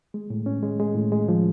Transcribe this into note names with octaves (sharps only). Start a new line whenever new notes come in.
G#3
A2
C#4
G#3
G#3
A2
G#3
F3